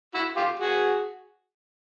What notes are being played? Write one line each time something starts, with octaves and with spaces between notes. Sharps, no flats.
E4 F#4
F4 G4
F#4 G#4